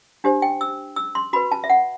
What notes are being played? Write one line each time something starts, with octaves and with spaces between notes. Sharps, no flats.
D4 G4 C5
G5
E6
E6
C6
F#4 B4 B5
A5
E5
F#5